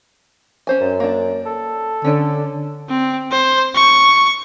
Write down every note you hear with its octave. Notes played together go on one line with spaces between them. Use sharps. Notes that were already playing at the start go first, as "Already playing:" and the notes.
C#4 C5 G#5
F#2
A#3 D4
A4
D3 C#4 C#5
C4
C5
C#6